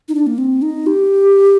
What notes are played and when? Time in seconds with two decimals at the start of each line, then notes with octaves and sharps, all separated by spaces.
0.08 D#4
0.15 D4
0.27 A#3
0.38 C4
0.62 D#4
0.87 G4